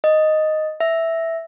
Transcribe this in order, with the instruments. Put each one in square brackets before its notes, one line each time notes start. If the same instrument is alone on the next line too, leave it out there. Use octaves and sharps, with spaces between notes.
[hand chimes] D#5
E5